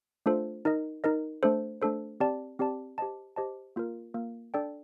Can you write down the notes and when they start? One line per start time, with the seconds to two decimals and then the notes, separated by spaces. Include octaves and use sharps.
0.26 A3 D4 F4 A4 C5
0.65 D#4 A#4 D#5
1.04 D#4 A#4 D#5
1.43 A3 D4 A4 C5
1.82 A3 D4 A4 C5
2.20 C4 G4 D5 A5
2.59 C4 G4 D5 A5
2.98 G4 C5 D#5 A5
3.36 G4 C5 D#5 A5
3.76 A#3 F4 A#4
4.14 A#3 F4 A#4
4.54 D4 A4 D5 G5